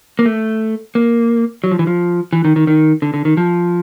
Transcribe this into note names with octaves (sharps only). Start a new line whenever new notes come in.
A#3
A3
A#3
F#3
F3
E3
F3
E3
D#3
D#3
D#3
D3
D3
D#3
F3